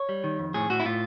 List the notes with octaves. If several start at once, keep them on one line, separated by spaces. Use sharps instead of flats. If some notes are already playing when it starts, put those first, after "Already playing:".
Already playing: C#5
G3
D#3
F2
A2 G#4
A2 F#4
E4
A2 F4